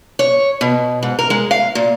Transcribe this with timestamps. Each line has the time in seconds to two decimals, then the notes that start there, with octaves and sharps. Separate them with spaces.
0.19 C#5
0.61 B2
1.03 G#2
1.19 A#4
1.30 G#3
1.51 F5
1.75 A#2